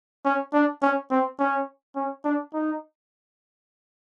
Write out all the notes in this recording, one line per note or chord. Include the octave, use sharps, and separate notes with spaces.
C#4
D4
C#4
C4
C#4
C#4
D4
D#4